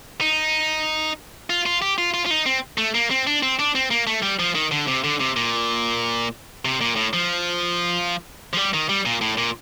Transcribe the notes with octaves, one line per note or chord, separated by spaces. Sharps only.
D#4
F4
F4
G4
F4
F4
F4
D#4
C4
A3
A#3
C4
D4
C4
D4
C4
A#3
A3
G3
F3
D#3
D3
C3
D3
C3
A#2
C3
A#2
A2
F3
F3
G3
D#3
G3
A#2
A2
A#2